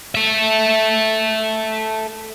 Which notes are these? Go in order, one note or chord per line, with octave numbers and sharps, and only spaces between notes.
A4 E5